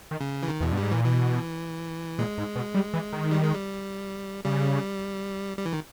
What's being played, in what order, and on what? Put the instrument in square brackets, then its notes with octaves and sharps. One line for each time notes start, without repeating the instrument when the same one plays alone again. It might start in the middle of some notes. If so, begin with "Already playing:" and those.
[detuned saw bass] D#3
[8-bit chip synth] C#3
E3
D#3
[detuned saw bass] E2 [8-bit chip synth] B2
[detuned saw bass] G2
[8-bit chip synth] G3
[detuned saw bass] G#2
[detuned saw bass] A#2 [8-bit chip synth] E3
[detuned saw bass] B2 [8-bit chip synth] E3
[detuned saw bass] A#2 [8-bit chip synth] G#3
[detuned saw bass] G#2
B2
G3
E3
D#3
[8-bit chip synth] G3
G#3
G3
[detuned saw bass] C#3 [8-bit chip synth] G3
[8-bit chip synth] G3
E3
D#3